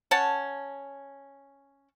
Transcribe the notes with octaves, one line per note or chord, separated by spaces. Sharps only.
C#4 F#5 A5